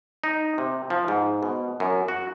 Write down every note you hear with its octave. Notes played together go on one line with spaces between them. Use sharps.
D#4
C3
F3
G#2
B2
F#2
F#4